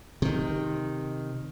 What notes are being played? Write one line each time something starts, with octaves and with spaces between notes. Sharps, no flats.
C3 D#3